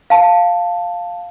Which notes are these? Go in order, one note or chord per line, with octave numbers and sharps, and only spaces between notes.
F5 A5